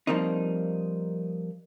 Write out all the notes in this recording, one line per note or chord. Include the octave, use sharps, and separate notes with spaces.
F3 G3 A#3 C4 D#4